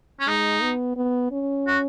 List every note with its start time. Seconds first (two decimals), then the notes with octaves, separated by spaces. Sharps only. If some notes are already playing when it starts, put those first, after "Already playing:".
0.20 C#4
0.27 G#3 D#4
0.62 B3
0.97 B3
1.32 C#4
1.67 F#4